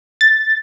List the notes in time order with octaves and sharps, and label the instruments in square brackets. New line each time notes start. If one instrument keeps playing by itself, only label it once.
[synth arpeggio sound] A6